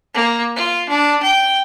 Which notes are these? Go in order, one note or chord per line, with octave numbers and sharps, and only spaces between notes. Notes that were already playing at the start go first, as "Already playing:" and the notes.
A#3
F4
D4
G5